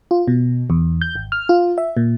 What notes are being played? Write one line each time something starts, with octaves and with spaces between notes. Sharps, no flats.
F4
B2
E2
G6
G#1
F6
F4
E5
A#2